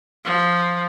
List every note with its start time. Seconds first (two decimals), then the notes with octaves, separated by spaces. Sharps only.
0.25 F3